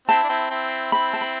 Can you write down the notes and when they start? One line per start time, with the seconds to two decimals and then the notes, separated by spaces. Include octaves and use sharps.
0.08 C4 E4 A5
0.24 D4
0.29 C4 E4
0.50 C4 E4
0.92 C4 E4 B5
1.13 A5
1.21 B5